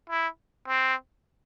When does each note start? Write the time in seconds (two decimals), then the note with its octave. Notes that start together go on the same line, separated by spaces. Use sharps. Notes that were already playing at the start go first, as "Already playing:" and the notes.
0.10 E4
0.68 C4